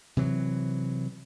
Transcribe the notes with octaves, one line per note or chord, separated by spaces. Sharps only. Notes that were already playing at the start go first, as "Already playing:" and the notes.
C3 E3 F#3